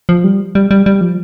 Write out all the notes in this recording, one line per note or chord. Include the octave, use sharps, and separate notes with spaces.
F3
G3
G3
G3
G3
F3